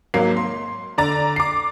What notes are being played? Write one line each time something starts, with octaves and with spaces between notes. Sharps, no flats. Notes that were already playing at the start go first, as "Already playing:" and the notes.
G#1 F#3 A#3 C7
C6
D3 D5 A#5 A6
D6 C7